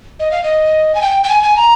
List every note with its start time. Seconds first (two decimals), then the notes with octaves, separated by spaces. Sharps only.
0.20 D#5
0.31 F5
0.44 D#5
0.95 G#5
1.02 G5
1.24 G5
1.29 G#5
1.43 G#5
1.57 A#5